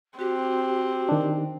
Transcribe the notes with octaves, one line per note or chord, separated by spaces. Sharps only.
C4 F#4 G4
D#3 D4